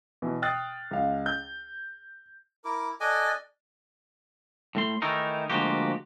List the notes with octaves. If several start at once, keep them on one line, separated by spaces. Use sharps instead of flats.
B2 E3
G5 D#6 F6 F#6 A6 C7
C#2 F5
G6
E4 A#4 D6
A4 D5 D#5 G#5 D6 F#6
A2 A3 C6
D#3 E3 A3 D#4 A#4
D2 F3 G#3 A#3 F#4 G4